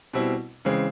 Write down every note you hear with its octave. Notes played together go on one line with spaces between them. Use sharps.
B2 G3 C4 E4
C#3 E3 G#3 C4